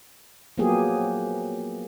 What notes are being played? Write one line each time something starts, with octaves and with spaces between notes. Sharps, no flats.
F3 F#3 A#3 B3 G4 G#4